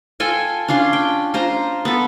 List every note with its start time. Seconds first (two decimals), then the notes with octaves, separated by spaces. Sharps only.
0.20 F4 A4 G5 G#5
0.68 C#4 D4 F4 C6
0.93 G5
1.34 F4 C5 A#5
1.85 B3 A4